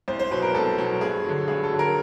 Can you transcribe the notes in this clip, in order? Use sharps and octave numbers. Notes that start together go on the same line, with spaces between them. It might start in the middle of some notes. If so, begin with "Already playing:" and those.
C2 C5
C5
B2 F#3 B4
A#4
C2 A4
B2 F#3
G2 G#4
D3 F#3
G2 G#4
A4
D3 F#3
A#4